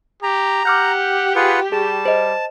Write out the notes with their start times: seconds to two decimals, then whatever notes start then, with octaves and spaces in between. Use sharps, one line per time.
0.23 G4 A#5
0.65 G4 F#5 D6 F6 G6
1.36 F4 G#4 B4 F#5
1.72 G3 G#4 A5
2.05 C5 D#5